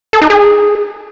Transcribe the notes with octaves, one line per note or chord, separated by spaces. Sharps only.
A4
D#4
G#4